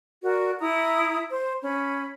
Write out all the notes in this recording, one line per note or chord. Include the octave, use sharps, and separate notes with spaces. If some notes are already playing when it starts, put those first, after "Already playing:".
F#4 A#4 D5
E4 A#5 D#6
C5
C#4 B5